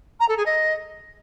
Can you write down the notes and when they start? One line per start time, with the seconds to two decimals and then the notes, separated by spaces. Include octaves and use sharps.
0.20 A#5
0.28 A4
0.37 G#4
0.45 D#5